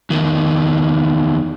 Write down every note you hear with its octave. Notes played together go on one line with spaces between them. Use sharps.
E2 D#3